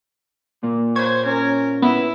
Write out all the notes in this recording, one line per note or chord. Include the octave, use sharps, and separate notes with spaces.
A#2 A#3
C5 C#5 G#6
C#4 A#4
B3 E4